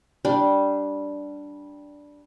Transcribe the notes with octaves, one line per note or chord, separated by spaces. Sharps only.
G3 D4